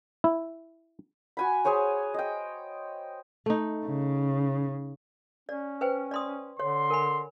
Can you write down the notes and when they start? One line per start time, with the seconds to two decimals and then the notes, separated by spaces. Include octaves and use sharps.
0.24 E4
1.37 F#4 G#5 B5
1.65 G#4 C5 C#5 G#5
2.14 D#5 G5
3.46 A3 D#4
3.87 C#3
5.49 C#4 D5
5.81 B4 C5 G5
6.11 D5 C6 D#6
6.60 D3 C#5 C6
6.90 A#4 G#5 B5